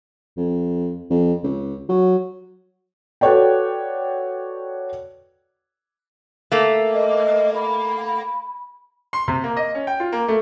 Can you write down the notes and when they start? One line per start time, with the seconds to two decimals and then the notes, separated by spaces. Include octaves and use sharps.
0.37 F2
1.10 F2
1.43 C#2
1.89 F#3
3.21 F#4 A4 B4 C#5 D5 G5
6.52 A3 A#3
6.94 D#5
7.56 B5
9.13 C6
9.28 C3
9.44 A#3
9.57 D#5
9.75 C#4
9.87 G5
10.00 F4
10.12 A#3
10.28 A3